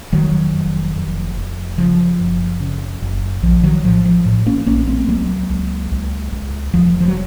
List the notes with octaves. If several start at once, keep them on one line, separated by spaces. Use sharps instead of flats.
F1 D#3 F#3
F1
F1
F1
C#3 F3
F#1
C#3
F#1
A#1 F3
D#3 F#3
A2 F3
F3
A2
A#3 C#4
A#1 A#3 C#4
A3 C4
C#2 F#3 A#3
C#2
C#2
C#2
F1 F3
F3
F#3